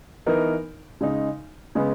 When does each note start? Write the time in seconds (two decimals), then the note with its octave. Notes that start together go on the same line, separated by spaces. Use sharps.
0.26 E3 B3 D#4 A#4
1.01 C#3 G#3 D#4
1.75 C#3 G#3 B3